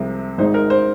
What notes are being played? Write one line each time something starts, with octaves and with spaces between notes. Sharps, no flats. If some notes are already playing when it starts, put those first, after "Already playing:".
Already playing: C2 C3 F3 G#3
G#1 G#2 G#3 D#4 C5
A#4
C5